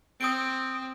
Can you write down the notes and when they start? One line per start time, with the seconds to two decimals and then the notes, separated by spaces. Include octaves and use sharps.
0.21 C4 D#6 D7